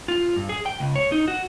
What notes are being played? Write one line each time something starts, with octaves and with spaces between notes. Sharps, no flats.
F4
G2
G#4
G5
C#2
C#5
D#4
F#4